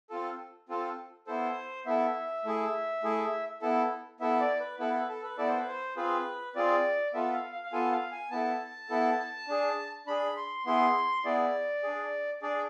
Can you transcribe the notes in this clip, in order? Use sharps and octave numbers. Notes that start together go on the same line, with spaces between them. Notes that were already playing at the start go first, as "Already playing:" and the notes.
C4 F4 A4
C4 F4 A4
B3 E4 A4 C5
B3 E4 A4 E5
A3 E4 G#4
A3 E4 G#4
B3 E4 A4
B3 E4 A4 E5
D5
B4
B3 E4 A4 B4
B4
A4
B4
B3 E4 A4 D5
C5
B4
C5
C4 F4 G#4 B4
C4 F4 G#4 D5
B3 F4 A4 E5
F5
F5
F5
B3 F4 A4 G#5
F5
G#5
B3 E4 A4 A5
B3 E4 A4
D4 G#4
D4 G#4 B5
C6
B3 E4 G#4 C6
B3 E4 G#4 D5
D4 G#4
D4 G#4 D5